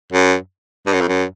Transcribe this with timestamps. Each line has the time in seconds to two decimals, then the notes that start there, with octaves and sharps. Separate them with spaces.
0.12 F#2
0.86 G2
0.93 F#2
1.01 F2
1.08 F#2